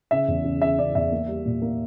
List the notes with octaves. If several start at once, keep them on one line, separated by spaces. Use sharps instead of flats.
C#3 E5
E2
C#3
C#3 E5
C#3 D5
E2 E5
A#3
G3
A#2
A#3